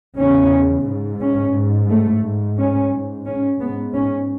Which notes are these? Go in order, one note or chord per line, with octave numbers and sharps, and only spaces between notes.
E2 C#3 C#4
G#2
C#4
G#2
A3
G#2
C#4
G#2
C#4
G#2 B3
C#4